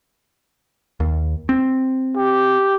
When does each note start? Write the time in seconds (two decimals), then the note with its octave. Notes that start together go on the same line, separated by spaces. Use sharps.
1.00 D#2
1.49 C4
2.16 G4